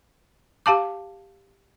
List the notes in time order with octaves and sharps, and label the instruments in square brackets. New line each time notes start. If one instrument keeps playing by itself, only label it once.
[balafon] G4 F5 A5 D6